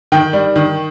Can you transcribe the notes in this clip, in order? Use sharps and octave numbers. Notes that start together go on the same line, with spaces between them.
D#3 G5
G3
D#3